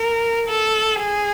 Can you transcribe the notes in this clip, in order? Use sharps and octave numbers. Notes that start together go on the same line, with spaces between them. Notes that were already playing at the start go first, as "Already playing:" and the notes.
Already playing: A#4
A4
G#4